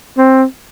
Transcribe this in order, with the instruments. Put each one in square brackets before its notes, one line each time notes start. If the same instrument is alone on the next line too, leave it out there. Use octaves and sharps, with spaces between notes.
[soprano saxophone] C4